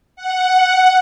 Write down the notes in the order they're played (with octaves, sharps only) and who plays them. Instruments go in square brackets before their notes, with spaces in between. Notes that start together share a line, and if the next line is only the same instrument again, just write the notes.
[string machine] F#5